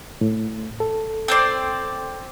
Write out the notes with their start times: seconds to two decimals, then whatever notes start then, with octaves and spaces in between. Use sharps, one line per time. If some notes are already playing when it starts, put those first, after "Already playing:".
0.21 A2
0.80 A4
1.28 C4 C5 D5